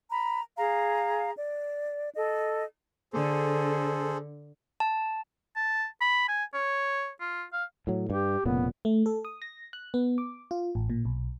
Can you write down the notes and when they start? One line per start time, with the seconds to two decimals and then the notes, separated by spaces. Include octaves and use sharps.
0.10 A#5 B5
0.58 G#4 F5 A#5
1.37 D5
2.16 A4 D#5
3.13 D3 G#4 A4 C5
4.80 A5
5.56 A5
6.01 B5
6.29 G#5
6.54 C#5
7.20 F4
7.53 F5
7.87 A2 F#3
8.10 G2 G4
8.45 F1 A#2 C#3 B3
8.85 A3
9.06 A4
9.25 D#6
9.42 A#6
9.73 F#6
9.94 B3
10.18 D6
10.51 F4
10.75 A1
10.90 A#2
11.05 B1